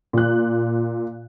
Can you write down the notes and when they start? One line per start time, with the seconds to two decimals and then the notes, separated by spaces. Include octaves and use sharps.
0.13 A#2 F#6